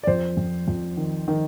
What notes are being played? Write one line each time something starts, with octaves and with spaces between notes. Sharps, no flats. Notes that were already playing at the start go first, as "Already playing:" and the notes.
D5
F2 C5
F2
F2
D#3
D#3